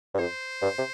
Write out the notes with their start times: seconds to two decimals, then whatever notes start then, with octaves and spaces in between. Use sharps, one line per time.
0.14 G2
0.19 F2 C5
0.62 G2
0.78 C3